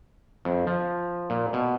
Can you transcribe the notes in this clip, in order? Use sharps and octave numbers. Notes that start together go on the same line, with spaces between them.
F2
F3
A#2
B2